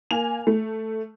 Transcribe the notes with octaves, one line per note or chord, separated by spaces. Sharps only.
A#3 G#5 F7
A3